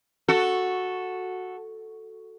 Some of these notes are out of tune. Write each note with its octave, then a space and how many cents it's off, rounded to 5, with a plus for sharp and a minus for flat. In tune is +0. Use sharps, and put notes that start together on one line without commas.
F#4 -5 A4 +0